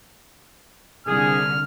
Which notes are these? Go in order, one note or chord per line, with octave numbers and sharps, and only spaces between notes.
C2 D3 G#4 F6